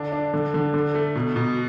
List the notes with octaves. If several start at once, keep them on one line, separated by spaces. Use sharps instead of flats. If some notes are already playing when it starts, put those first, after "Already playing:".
Already playing: D3 D4
D4
D3
D3
D3
A3
B2
B2